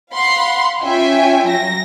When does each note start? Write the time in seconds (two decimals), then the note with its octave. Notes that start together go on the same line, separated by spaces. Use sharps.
0.14 F5 F#5 B5 C6
0.82 C#4 F4 E5 G5 G#5
1.48 F#3 A#6